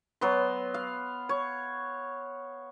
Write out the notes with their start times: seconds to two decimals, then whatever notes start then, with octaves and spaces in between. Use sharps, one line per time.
0.21 F#3 B3 C6
0.74 F5
1.29 C#5